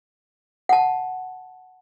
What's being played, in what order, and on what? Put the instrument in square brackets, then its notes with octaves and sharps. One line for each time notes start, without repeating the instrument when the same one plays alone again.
[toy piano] F#5 A5